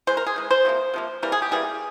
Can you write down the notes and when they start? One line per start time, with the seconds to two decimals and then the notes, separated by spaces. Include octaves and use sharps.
0.07 E3 G#3 C5
0.17 A#4
0.27 G#4
0.36 E3 G#3
0.51 C5
0.65 C3 F3 A#3
0.94 C3 F3 A#3
1.23 C3 E3 G3 A#3 A#4
1.32 G#4
1.42 G4
1.51 C3 E3 G3 A#3 G#4